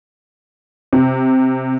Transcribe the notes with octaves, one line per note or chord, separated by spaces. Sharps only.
C3